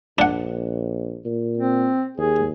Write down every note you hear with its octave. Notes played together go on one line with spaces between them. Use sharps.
A#1 D4 F#5
A#2
C4
D#2 G#4